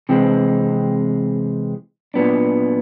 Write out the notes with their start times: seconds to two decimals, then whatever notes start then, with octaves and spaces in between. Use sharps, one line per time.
0.09 C3 E3 G#3 C4
2.14 A#2 F#3 B3 D4